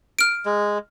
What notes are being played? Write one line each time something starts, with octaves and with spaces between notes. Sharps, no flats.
F6 D7
G#3